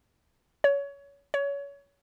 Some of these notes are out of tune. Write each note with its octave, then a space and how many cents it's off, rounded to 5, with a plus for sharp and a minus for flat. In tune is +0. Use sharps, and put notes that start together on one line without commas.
C#5 +25
C#5 +25